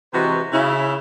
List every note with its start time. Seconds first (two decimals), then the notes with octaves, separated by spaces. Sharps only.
0.13 C3 E3 G#3 F#4 B4
0.53 C#3 E4